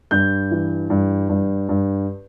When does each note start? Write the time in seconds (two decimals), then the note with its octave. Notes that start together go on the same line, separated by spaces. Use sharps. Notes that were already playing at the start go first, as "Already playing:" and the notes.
0.11 G2 G6
0.51 E3
0.90 G2
1.29 G2
1.69 G2